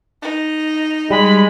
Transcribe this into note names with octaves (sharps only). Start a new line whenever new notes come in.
D#4
G3 G#3 B5